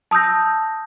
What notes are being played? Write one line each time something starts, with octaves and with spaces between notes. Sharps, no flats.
A5 D#6 E6 G6 A#6